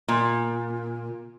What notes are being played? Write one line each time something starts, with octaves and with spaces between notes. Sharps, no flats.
A#2